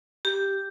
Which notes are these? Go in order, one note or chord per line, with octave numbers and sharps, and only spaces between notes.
G4